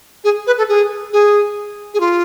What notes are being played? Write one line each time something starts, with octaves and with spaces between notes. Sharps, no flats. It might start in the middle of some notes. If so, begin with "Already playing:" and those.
G#4
B4
A4
G#4
G#4
G#4
F4